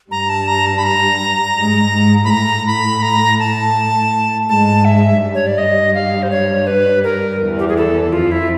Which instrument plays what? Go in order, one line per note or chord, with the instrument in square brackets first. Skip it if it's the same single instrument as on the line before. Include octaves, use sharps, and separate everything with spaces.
[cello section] G2 G3 [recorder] A#5
[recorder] A5
A#5
A5
B5
A#5
[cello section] G#2 G#3
G#2 G#3
[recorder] B5
[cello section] A2 A3 [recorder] A#5
[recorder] B5
A#5
A5
[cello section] G#2 G#3 [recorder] A5
[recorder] E5
[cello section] G2 G3
[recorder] C#5
D5
D#5
F5
C5
C#5
B4
A#4
[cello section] E2 E3
[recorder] G4
G#4
A4
[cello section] F2 F3 [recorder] F4
[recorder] E4